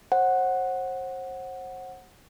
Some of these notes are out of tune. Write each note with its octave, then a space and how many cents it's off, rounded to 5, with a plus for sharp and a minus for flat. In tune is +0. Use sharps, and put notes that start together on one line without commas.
C5 +35 F#5 +0